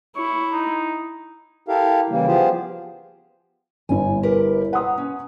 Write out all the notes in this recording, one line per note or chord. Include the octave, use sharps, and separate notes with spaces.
E4 C#5
D#4
E4 G4 A4 A#4 F5
C#3 E3 G3 A#3
F3 B3 F4 G4 G#4 C5
G1 G2 E4 G#5
G4 A#4 B4
B4 F#5 A#5 C6 D#6
C#4